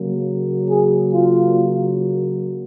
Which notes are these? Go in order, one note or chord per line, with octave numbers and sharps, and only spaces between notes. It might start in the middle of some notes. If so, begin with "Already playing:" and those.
Already playing: C#3 F#3 A#3
G#4
F4